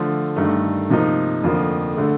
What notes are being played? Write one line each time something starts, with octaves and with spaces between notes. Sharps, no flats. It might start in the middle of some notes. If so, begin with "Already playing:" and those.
Already playing: D3 F3 A3
G2 D#3 A3
C3 F3 A#3 D#4
F2 D3 F3 A#3
D3 A3